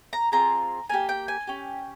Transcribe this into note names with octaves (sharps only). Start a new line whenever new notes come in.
A#5
C4 F4 G#4 A#5
A#3 D#4 G4 G#5
G5
G#5
C#4 G4